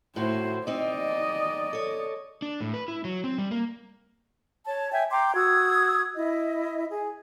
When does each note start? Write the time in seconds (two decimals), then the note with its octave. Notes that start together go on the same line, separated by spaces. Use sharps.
0.16 A2 E4 F#4 C5
0.67 C4 D#4 D5 D#5
1.73 A4 C#5
2.42 D4
2.60 A2
2.74 B4
2.88 E4
3.05 F#3
3.24 C4
3.38 G3
3.51 A#3
4.66 C#5 A5
4.92 E5 G5 G#5
5.12 G5 A#5 C6 D6
5.35 F#4 D#6 E6 G#6
6.16 E4 D#5
6.89 G#4